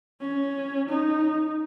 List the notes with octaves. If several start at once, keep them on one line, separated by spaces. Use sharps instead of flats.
C#4
D#4